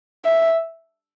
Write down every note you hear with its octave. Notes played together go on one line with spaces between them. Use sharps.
E5